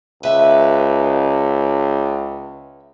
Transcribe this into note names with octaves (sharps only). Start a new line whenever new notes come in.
C#2 B4 E5